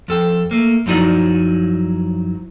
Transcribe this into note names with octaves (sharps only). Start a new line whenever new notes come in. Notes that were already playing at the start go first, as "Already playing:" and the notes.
F2 A4 G5
A3 A#3
F#2 F3 F#3 D#4 E4 D5